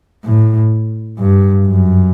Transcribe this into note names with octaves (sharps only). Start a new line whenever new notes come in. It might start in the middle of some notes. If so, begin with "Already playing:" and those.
A2
G2
F#2